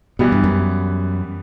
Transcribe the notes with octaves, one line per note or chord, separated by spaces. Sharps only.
B2 E3 G3 B3
G2
F#2